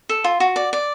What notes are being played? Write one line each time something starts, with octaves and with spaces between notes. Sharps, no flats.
A4
F4
F#4
D5
D5